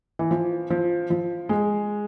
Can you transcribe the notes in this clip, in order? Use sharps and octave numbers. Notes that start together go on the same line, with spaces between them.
E3
F3
F3
F3
G#3